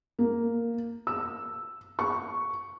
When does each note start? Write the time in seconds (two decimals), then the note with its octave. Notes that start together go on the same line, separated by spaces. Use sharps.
0.19 A#3
1.07 E6
1.99 C#6